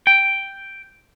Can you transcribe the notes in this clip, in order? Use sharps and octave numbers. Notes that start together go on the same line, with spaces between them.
G5